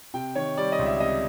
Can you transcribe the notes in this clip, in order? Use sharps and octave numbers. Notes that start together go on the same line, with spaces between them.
C3 G5
D#3 C#5
G3 D5
D#5
C#2
E5
C3 D#5